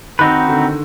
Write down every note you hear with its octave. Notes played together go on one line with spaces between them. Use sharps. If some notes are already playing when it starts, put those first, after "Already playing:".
D#3 C4 D#4 F#4 B4
D3